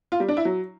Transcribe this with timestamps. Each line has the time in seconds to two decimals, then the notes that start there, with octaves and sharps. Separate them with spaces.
0.12 F4
0.20 G3
0.29 D4
0.37 E4
0.45 F#3